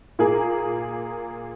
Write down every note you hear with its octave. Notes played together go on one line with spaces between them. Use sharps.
A#2 A#3 G#4